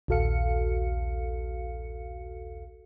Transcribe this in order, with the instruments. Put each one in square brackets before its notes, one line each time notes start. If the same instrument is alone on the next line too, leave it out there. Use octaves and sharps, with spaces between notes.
[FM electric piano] A#1 D#2 F#4 A4 F5 C#7